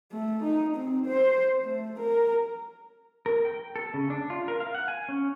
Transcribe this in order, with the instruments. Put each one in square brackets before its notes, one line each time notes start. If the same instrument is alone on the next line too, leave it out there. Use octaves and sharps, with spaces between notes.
[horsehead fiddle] A3
D#4
C4
C5
A3
A#4
[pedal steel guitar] A#4
G5
A4
C#3
D4
F4
A#4
F5
F#5
G#5
C#4